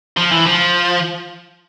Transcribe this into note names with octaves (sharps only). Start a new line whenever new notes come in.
F3
E3
F3